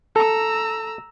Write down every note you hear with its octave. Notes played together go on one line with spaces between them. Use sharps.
A4 A#5 E6